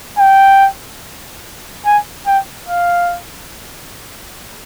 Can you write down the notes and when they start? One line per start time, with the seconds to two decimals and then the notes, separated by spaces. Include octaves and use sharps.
0.18 G5
1.85 G#5
2.26 G5
2.69 F5